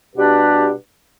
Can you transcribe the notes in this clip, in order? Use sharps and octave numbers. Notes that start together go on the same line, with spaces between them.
B2 G3 D4 G4 B4